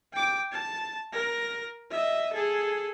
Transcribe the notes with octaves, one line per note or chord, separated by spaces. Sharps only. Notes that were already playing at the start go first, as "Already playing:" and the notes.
G5 D6
A5
A#4 A#6
D#5 E5
G#4 A4